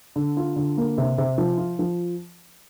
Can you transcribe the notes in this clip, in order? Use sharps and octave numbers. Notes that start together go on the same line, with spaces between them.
D3
F4
D3
A#3
C3
C3
F3
F4
F3